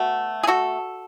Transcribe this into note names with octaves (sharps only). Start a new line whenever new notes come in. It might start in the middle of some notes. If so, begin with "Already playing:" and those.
Already playing: B2 A3 F#4
G#4
F#4 A4